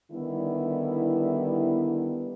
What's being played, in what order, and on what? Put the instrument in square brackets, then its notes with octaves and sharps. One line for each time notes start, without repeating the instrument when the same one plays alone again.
[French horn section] D3 D#3 G3 B3 E4